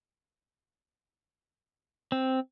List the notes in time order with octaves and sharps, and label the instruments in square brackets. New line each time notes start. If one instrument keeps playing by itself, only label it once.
[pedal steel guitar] C4